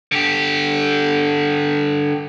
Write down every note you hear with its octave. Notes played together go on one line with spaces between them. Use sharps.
D3 G4